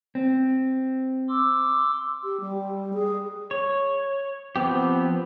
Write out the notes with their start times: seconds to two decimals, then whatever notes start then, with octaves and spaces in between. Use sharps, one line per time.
0.15 C4
1.29 C6 D6 E6
2.24 G4
2.40 G3
2.93 G#4
3.51 C#5
4.56 F3 B3 C4 G4